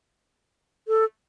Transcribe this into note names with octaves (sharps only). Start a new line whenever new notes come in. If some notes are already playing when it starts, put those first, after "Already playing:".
A4